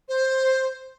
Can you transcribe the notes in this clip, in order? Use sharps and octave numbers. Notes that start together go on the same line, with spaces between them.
C5